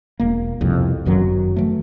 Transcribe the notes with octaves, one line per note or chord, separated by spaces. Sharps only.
E1 A#3
C2 F2 B2
G1 F#2 D#3 F#3
E3 F3 A3